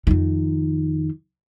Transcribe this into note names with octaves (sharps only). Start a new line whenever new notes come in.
F2 D#3